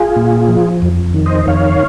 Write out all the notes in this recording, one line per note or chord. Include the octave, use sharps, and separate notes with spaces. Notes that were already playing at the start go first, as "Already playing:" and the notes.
Already playing: F4 G#4
A#2
F3
F2
D#3
C5 D#5
F2 C#5 F5